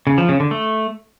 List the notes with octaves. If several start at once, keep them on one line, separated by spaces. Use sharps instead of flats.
C#3
F3
C#3
D3
A3